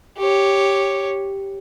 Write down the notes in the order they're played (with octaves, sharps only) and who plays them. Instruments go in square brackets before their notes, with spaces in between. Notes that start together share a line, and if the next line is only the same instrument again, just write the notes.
[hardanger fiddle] G4 C#5